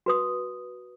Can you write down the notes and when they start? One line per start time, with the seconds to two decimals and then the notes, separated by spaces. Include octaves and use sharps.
0.06 F#4 B4 D#6